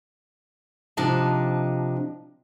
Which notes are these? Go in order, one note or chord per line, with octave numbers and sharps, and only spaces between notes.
C3 F3 D4 D#4 A5